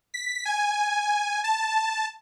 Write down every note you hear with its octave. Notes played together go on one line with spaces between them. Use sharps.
B6
G#5
A5